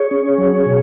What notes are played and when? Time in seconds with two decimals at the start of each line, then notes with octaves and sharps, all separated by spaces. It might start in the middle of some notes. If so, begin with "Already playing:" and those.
Already playing: G#4 C#5
0.11 C#4
0.38 F#3
0.66 B2